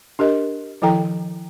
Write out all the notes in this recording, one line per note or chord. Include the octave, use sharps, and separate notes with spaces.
D4 G4 A#4 D#5
D#3 F3 E4 A4 G5 A#5